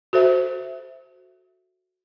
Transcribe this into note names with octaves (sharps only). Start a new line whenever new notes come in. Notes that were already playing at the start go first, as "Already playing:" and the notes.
F#4 A4 C5 E5